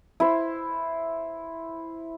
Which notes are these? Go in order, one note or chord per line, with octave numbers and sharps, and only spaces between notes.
E4 C5